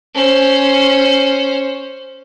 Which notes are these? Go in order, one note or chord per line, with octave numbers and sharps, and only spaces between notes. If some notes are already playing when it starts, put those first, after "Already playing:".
C#4 C5